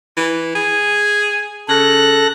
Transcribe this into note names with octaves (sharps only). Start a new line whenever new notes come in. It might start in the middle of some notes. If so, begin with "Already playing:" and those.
E3
G#4
C#3 A4 F#6 A#6